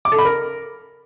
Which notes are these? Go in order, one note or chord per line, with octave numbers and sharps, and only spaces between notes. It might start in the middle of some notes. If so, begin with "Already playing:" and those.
D6
A4
B5
A#4